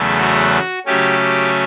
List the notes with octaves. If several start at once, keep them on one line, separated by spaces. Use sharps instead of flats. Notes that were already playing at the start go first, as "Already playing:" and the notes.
Already playing: E2 C#3 F#3 A3
F#4
C#3 F#3 A3 C#4 G4
G4